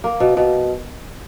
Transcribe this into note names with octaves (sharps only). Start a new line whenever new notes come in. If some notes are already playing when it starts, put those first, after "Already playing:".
A#3
B2
B2